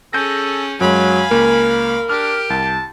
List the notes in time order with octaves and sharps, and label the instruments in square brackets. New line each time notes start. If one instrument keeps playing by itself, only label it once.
[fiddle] C#4 G#4 [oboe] A4 [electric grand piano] G6 A#6
[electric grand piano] F#2 G#3 [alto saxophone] F#3 [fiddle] F5 B5 [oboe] G#5
[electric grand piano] C#2 A#3 [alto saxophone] A#4
[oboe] D4 [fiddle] G4 [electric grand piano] F6
[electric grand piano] C2 [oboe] A5